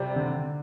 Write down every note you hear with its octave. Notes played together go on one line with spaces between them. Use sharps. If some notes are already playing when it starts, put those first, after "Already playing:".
Already playing: C3 G3 C4 G4 D5
D3